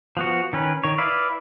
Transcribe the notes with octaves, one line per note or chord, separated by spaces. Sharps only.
F3 B3 F#4
D#3 C#4 B4
D#3 C#5
E4 B4 D5 F5